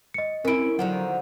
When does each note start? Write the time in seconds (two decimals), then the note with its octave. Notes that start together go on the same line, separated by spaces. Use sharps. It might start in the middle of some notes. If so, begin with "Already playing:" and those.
0.14 D#5 C#7
0.45 C4 C#4 E4 A#4 D7
0.79 D3 D#3 F3 F#3 F#5